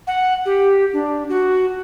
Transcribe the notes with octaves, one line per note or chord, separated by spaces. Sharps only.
F#5
G4
D4
F#4